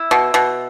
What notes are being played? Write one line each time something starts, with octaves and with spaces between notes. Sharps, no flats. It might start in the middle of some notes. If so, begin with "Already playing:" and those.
Already playing: E4
B2
B2